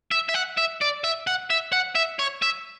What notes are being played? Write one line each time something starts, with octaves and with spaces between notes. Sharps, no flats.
E5
E5
F#5
E5
D5
E5
F#5
E5
F#5
E5
C#5
E5